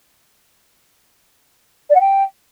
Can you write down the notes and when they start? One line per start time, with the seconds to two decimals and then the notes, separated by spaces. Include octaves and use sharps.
1.89 D5
1.95 F#5
2.00 G5